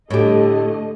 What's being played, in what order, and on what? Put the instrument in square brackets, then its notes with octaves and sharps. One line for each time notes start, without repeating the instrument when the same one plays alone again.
[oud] A2 G4 [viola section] D3 A3 D#5